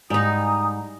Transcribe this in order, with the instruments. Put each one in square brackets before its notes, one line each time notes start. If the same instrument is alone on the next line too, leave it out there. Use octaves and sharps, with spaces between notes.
[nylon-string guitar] G#2 [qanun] G3 D#4 [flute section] G#5 A#5 D#6